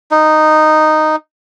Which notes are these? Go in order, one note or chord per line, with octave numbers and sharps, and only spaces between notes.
D#4